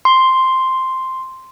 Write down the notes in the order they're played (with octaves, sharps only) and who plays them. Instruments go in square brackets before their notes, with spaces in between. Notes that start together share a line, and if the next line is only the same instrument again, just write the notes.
[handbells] C6